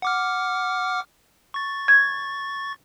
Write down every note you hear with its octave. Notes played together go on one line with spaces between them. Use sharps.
F#5 D6 F6
C#6 A6
G#6